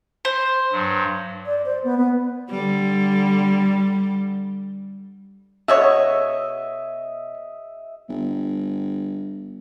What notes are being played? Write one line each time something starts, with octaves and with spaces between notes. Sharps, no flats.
C5
G2 F#3
D5
C5
B3
B3
D3 G3
B2 F#4 C#5 D#5 E5
G1